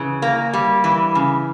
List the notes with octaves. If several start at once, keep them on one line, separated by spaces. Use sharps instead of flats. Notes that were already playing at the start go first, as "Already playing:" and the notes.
Already playing: C#3 E3
A#3
G3
E3
C#3